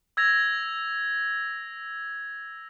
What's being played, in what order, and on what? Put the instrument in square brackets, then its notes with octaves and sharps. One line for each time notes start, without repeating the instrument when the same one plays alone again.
[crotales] E6 G#6 A#6 F7